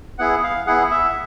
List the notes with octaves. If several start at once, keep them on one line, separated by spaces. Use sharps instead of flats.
B3 E4 G#4 F#5
F5
B3 E4 G#4 F#5
E5